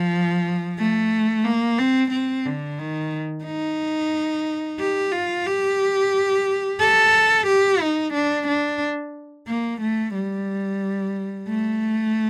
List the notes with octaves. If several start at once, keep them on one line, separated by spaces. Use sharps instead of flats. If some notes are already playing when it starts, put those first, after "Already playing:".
Already playing: F3
A3
A#3
C4
C4
D3
D#3
D#4
G4
F4
G4
A4
G4
D#4
D4
D4
A#3
A3
G3
A3